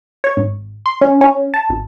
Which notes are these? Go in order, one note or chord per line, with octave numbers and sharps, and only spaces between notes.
C#5
G#1
C6
C#4
C#4
A5
G#1